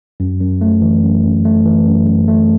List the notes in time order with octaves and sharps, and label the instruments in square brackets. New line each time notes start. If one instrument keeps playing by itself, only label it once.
[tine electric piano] F#2
F#2
A3
E3
F#2
F#2
A3
E3
F#2
F#2
A3